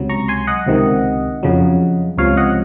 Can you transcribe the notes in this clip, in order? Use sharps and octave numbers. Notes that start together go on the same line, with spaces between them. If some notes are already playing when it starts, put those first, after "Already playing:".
Already playing: C#2 C3 F#3
A#5 C#6
G#5 C6
D#5 F#5
C#2 C3 D#3
F2 C#3 F#3
C#2 C3 F3 C#5 F5
D#5 F#5